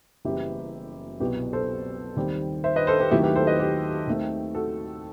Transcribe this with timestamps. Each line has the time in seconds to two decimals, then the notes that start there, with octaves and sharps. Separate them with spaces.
0.25 F#1 F#2 E3 G3 B3 E4 G4
1.20 C2 B2 F#3 B3 E4 G4
1.53 A4 C5
2.16 D#2 D#3 G3 C4
2.64 C5 E5
2.76 B4 D#5
2.87 A4 C5
3.00 G4 B4
3.11 D#2 D#3 F#3 A3 C4 E4 G4
3.23 G4 B4
3.36 A4 C5
3.47 B4 D#5
3.59 G4 B4
4.07 D#2 D#3 A3 C4
4.55 F#4 A4